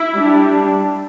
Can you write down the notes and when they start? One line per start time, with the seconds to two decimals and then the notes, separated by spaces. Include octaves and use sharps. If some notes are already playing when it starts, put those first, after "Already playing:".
Already playing: E4
0.15 G3 D4